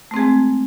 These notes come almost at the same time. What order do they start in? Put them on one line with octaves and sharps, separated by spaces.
A3 C4 G#4 G#3